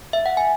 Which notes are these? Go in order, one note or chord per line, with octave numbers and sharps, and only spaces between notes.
E5
F#5
G#5